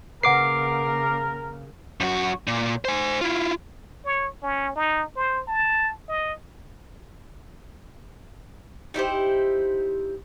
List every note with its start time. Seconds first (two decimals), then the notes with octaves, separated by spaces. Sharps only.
0.23 C#3 A#3 A#4 B4 F#5 D6 C7
2.00 F#2 F#4
2.47 A#2
2.85 C5 G#5
3.21 E4 F4
4.05 C#5
4.42 C#4
4.76 D#4
5.16 C5
5.47 A5
6.08 D#5
8.94 D#4 E4 G4 C5